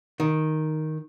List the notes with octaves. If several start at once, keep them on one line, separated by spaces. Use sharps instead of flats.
D#3